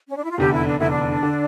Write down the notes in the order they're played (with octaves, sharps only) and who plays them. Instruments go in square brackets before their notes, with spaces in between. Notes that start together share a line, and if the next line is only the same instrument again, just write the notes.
[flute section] C#4
D4
E4
F4
[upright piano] F1 E2 D3 [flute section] G4
[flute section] E4
D4
[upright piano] F1 E2 D3 [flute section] E4
[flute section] D4
[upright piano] D3